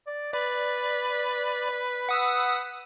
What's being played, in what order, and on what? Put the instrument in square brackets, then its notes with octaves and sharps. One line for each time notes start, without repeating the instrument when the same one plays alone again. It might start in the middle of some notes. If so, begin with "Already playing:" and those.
[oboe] D5
[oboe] B4 [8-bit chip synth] D5
[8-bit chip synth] F#5 D#6 E6